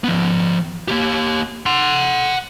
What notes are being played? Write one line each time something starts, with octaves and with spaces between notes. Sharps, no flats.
F3 B3
A#3 G4
F#5 C6